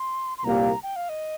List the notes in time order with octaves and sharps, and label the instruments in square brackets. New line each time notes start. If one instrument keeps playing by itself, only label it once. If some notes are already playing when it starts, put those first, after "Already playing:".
Already playing: [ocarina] C6
C6
[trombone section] C2 A#2 A#3 G4 [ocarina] A#5
[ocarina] G5
F5
D#5